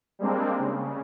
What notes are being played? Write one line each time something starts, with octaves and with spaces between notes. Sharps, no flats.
G3 G#3 A#3 C4 D4
C#3